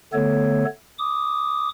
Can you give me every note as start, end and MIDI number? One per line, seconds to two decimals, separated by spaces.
0.13 0.65 50
0.13 0.65 57
0.13 0.65 59
0.13 0.65 69
0.13 0.65 73
0.99 1.69 86
0.99 1.69 87